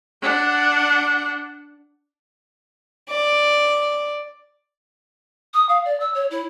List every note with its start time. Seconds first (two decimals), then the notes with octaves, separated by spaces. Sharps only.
0.22 D4 F#5
3.10 D5
5.54 D#6
5.69 F5
5.85 D5
6.00 E6
6.15 C#5
6.31 E4